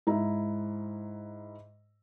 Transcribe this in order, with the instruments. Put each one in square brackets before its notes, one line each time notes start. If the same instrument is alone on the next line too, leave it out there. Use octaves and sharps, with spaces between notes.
[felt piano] G#2 E4 A#5